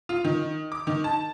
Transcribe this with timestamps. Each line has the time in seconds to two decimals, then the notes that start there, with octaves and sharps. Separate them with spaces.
0.09 F4
0.24 D#3
0.72 D6
0.87 D#3
1.04 A5